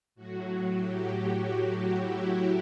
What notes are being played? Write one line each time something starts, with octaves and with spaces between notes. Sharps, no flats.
A2 F#3 F#4
G4
F#4
E4